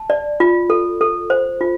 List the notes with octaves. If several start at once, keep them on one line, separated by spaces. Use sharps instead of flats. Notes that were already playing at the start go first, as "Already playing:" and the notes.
Already playing: A5
D5
F4
A4
A4
C5
F4